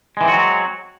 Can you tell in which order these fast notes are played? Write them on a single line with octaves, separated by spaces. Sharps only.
G#3 E3 C4 F#4 F#3